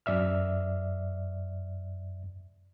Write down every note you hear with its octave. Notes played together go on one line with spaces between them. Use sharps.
F#2 D5 E5 F6